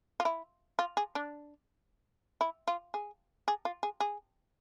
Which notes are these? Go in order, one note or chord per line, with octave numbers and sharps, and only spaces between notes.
F4
E4
F4
G#4
D4
E4
F4
G#4
G#4
F4
G#4
G#4